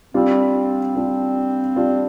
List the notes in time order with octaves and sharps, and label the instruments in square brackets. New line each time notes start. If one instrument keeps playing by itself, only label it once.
[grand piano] G3 D4 F4 [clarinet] C4
[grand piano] G3 D4 F4
G3 D4 F4